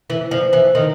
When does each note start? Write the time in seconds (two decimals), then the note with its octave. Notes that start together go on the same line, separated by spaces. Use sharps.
0.10 E3
0.31 F3
0.53 E3
0.75 D#3